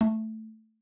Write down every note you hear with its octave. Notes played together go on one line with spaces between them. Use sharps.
A3